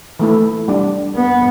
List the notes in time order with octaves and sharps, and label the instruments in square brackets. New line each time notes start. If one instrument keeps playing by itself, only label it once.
[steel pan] E3 A3 E4
G3 D4
[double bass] B3